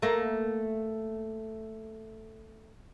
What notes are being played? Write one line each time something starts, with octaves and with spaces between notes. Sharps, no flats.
A3 A#3